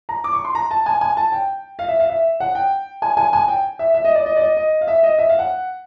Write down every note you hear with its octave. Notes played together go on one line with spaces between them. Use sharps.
A#5
D6
C#6
C6
A#5
A5
G#5
G#5
A5
G5
F5
E5
F5
E5
F#5
G5
G#5
G#5
G#5
G5
E5
E5
D#5
D5
D#5
D5
D#5
D#5
F5
E5
D#5
E5
F5
F#5